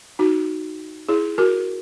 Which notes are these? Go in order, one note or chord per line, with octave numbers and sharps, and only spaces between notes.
D#4 F#4
E4 G#4
F#4 A#4